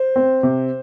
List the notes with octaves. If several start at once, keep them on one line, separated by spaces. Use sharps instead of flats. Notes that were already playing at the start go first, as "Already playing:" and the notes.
Already playing: C5
C4
C3